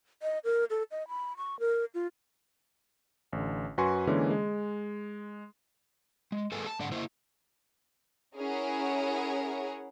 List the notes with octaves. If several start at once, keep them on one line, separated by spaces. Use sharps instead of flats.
D#5
A#4
A4
D#5
B5
C#6
A#4
F4
A1 D3
F#2 F#4 B4 G#5 C6 C#6
D3 E3 G#3 A#3 C#4
G#3
G#3
G#3 A#3 A4 B4 G#5
A5
G#2 D3 D5 F#5
A#3 E4 C5
C#4 E4 G#4 A#4 C#5 F#5